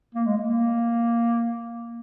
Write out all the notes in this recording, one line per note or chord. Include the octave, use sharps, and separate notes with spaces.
A#3
G#3
A#3